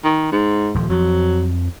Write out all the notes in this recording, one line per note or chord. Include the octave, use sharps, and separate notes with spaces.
D#3
G#2
D#1 F3
F2 F3 F#3